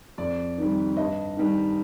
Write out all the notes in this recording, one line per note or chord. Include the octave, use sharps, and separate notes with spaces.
F2 D5
D#3 G3
G2 D#5
D#3 G3